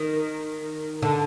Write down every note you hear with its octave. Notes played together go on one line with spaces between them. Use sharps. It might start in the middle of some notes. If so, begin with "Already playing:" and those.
Already playing: D#3
D3